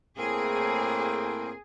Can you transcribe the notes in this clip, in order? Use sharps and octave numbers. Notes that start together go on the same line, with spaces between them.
A2 A#3 C4 G#4